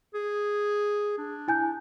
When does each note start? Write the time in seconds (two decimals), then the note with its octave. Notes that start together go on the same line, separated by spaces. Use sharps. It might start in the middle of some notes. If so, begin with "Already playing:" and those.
0.14 G#4
1.18 D4
1.48 E4 G#5 G6